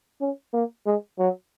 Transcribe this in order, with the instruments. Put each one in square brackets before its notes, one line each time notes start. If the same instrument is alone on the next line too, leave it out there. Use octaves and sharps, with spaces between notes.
[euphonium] C#4
A#3
G#3
F#3